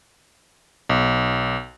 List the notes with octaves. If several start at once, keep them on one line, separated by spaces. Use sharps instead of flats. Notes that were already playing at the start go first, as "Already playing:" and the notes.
B1